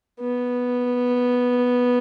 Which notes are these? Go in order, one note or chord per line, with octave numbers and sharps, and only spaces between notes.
B3